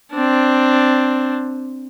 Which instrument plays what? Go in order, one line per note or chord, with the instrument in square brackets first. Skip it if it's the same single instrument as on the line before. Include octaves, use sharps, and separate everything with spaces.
[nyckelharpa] C4 D4